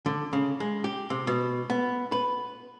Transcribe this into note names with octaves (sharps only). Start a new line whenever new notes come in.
D3
C#3
G#3
G4
C3
B2
B3
B4